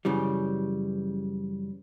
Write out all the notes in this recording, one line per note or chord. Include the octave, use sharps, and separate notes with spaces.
F#2 C#3 E3 G3